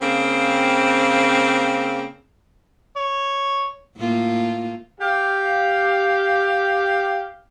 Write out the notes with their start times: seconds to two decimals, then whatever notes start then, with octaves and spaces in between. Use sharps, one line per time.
0.01 C#3 A#3 C4
2.97 C#5
3.97 A2 A#3 F4
5.00 G4 F5